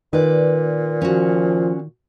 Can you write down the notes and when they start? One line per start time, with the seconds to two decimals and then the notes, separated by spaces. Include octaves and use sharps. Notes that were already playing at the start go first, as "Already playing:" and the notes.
0.13 A#2 D#3 B4 D5
1.02 F3 C#4 F#4